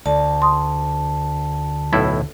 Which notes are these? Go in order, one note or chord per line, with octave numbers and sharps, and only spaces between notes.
D2 D5 A5
C6 D#6
B1 A2 E4